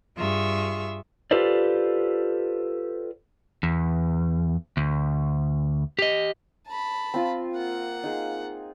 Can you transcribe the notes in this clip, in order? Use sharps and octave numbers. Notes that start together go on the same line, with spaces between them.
G2 F4 G#4 E5 C#6
F4 G4 A4 B4 C5 D5
E2
D2
G4 D#5
A5 B5
C4 F4
A#3 F#5
D#4 G#4